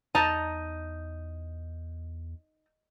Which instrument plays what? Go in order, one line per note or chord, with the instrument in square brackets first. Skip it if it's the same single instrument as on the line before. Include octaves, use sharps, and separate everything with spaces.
[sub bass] E2 [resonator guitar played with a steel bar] D#4 A#5 [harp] D#5 [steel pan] A5